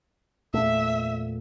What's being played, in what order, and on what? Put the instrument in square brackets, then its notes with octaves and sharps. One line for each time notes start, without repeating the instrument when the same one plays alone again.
[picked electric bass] E2 A#2 A3 [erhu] E5